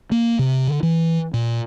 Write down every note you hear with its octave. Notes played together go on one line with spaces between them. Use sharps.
A#3
C3
D3
E3
A#2